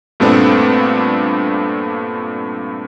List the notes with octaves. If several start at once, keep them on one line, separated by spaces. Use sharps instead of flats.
G2 A#2 A3 B3 C4 D4